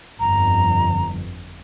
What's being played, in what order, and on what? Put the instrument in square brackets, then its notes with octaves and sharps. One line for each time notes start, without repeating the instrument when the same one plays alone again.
[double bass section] G1 F2 [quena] A#5